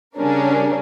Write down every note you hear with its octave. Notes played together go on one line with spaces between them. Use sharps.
C#3 G3 C#4 D4 A#4